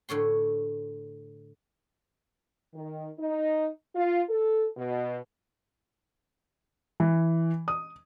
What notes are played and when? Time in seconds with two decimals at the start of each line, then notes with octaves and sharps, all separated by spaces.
0.09 A2 D3 C#5 C6
2.73 D#3
3.18 D#4
3.94 F4
4.29 A4
4.77 B2
7.00 E3
7.68 D#6